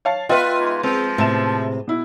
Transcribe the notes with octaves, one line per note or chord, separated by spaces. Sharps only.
C#5 F5 A5
B3 F4 B4 D#5 E5 G5
G#2
F3 G#3 C4
A2 C3 B3 E5 A5 E7
B2 E4